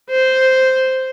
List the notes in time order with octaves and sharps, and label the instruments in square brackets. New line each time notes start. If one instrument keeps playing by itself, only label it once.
[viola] C5